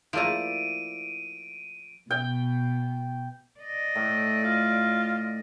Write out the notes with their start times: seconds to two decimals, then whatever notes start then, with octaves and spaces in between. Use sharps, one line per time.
0.13 F3 A3 A#3 E4 D5 D7 D#7
2.11 B2 G5
3.60 D5 D#5
3.95 A2 A3
4.44 F4